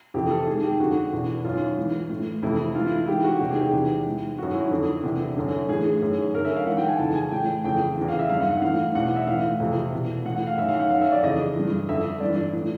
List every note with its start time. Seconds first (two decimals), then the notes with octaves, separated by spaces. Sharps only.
0.14 F2 C3 E3 G4
0.31 A4
0.47 G#2 D#3 G#4
0.63 G4
0.80 F2 D3 F#4
1.13 E2 B2
1.44 F#2 D#3 F4
1.77 G#2 E3
2.09 A2 E3
2.43 F2 C3 E3 E4
2.75 G#2 E3 F4
2.86 E4
2.97 E4
3.07 G#2 E3 G4
3.24 F#4
3.40 E2 C3 D#3 G4
3.51 G#4
3.60 G4
3.73 E2 C3 E3
4.06 G#2 E3
4.38 F#2 D#3 F#4
4.55 E4
4.71 F2 D3
5.03 E2 C3 E3
5.37 F#2 D3
5.68 A2 E3 G#4
6.02 F#2 D#3
6.34 F#2 D3 A#4
6.45 E5
6.56 F5
6.66 G#2 E3 F#5
6.77 G5
6.88 G#5
6.99 F2 C#3 E3 A5
7.15 G#5
7.31 A2 E3 G5
7.64 F2 C#3 E3 G5
7.97 E2 C#3 E3
8.08 F5
8.19 E5
8.29 G2 D#3 F5
8.40 F#5
8.51 F#5
8.62 A2 E3 F5
8.95 E2 B2 F#5
9.16 E5
9.27 A2 E3 F5
9.60 F2 C3 E3
9.92 E2 B2
10.25 A2 E3 F#5
10.35 F#5
10.47 F5
10.57 F#2 D#3 E5
10.68 F5
10.80 F#5
10.90 F#2 D#3 F5
11.01 E5
11.12 D5
11.23 F2 C#3 E3 D#5
11.56 G2 E3
11.89 F2 D3 E5
12.20 G2 E3 D5
12.53 A2 E3